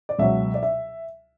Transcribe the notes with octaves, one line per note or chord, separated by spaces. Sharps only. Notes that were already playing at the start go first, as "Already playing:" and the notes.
D5
C#2 B2 F#3 E5
D5
E5